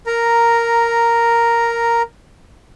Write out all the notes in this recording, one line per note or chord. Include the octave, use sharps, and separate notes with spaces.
A#4 A#5